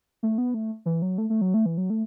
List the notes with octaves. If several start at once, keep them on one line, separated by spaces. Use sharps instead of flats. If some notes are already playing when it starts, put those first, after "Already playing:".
A3
B3
A3
E3
F#3
A3
A3
F#3
A3
E3
F#3
A3